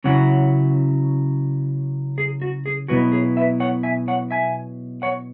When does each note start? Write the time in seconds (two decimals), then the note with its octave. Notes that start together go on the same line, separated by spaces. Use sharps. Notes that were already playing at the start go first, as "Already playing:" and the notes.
0.04 C#3 F#3 C#4 E4 C#5 F#5
2.18 G#4
2.42 F#4
2.66 G#4
2.88 B2 F#3 B3 E4 F#4 B4
3.12 G#4 C#5
3.36 B4 E5
3.60 C#5 F#5
3.83 E5 G#5
4.08 C#5 F#5
4.31 E5 G#5
5.02 C#5 F#5